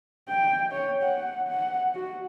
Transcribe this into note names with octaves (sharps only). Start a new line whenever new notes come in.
G5
C#5
F#5
F#5
F#4